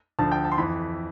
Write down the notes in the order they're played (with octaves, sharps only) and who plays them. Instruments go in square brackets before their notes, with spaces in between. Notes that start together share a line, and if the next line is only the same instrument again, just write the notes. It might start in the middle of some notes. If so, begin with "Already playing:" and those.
[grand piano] D2 D3 F3 A5
G5
A5
C6
F2 E3 B5